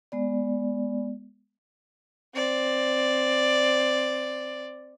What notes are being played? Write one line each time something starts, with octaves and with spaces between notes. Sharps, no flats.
G#3 B3 D5
C4 D5